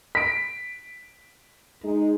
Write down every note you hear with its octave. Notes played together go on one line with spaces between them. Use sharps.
B6 D7
G#3 D#4